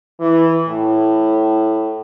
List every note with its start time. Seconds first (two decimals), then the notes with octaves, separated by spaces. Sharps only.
0.20 E3
0.68 A2